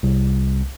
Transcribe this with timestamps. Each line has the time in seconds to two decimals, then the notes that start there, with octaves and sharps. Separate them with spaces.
0.03 C2